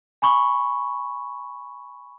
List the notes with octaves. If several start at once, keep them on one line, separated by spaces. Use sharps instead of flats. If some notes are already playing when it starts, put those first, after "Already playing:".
G#5 B5 C#6